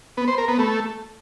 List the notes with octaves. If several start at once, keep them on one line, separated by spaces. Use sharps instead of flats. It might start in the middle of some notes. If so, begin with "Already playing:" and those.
B3
C5
A#4
B3
A3